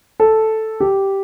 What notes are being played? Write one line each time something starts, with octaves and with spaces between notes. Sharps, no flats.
A4
G4